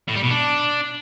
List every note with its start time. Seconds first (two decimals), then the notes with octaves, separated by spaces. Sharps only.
0.08 A2
0.16 G3
0.23 B2
0.31 D4